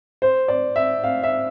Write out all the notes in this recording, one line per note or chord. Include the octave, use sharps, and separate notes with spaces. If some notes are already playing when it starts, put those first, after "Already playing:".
C5
D5
E5
F5
E5